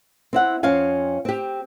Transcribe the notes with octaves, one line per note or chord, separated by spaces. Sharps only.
C4 E4 F#5
F2 C4 C#4 F5 G#5
C4 G4